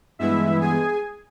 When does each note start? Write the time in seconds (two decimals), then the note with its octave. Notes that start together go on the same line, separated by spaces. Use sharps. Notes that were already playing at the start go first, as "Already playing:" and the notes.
0.19 G2 E3 G#3 B3 E4 E5
0.60 G#4 G#5